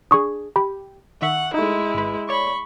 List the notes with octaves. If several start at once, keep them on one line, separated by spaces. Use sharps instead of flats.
D4 G#4 C#6 D#6
G4 B5
D#3 E5 F#5 C#6
G#3 A3 D#4 E4
G#1 B4
C#5 D5 B5 C#6